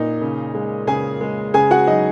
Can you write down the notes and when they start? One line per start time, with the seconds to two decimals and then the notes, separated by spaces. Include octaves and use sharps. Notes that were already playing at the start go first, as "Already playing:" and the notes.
Already playing: A#2 D#4 D#5
0.21 C#3
0.55 G#3
0.87 C#3 G#4 G#5
1.21 G#3
1.54 C#3 G#4 G#5
1.71 F#4 F#5
1.87 F#3 D#4 D#5